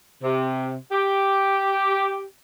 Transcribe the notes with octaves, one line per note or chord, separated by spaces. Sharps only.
C3
G4